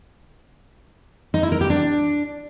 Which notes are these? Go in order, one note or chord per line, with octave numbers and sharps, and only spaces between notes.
D#4
E4
A#4
G4
D4